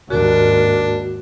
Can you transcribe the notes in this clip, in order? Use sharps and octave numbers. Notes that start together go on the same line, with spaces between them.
D#2 G#2 D4 F#4 A#4